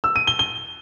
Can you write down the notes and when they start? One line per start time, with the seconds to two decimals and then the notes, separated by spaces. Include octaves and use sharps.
0.04 E6
0.16 D#7
0.27 G7
0.39 G7